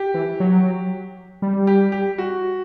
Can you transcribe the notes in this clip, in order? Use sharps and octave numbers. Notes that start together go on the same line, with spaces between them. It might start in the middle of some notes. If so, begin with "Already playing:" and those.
Already playing: G4
E3
F#3
G3
G4
G4
F#4